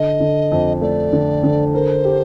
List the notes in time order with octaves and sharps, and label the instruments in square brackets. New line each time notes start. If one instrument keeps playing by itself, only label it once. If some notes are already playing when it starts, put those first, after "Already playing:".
Already playing: [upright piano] D3 [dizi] D#5
[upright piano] D3
F2
[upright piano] A3 [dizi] D5
[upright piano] D3
D3
[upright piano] A#4 [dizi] C5
[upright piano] G4